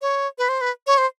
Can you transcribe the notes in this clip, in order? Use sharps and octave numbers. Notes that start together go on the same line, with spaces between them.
C#5
B4
C5
B4
C#5
C5